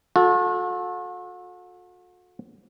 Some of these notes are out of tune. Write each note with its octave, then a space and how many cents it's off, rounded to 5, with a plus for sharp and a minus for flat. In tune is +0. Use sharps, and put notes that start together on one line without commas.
F#4 -45 A4 -10